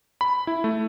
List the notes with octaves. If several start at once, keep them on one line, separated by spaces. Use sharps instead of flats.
B5
E4
A3